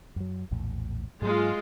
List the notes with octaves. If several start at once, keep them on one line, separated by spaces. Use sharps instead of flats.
F#2 F#3
A#1 E2 A2
G#2 F#3 G#3 A#3 F4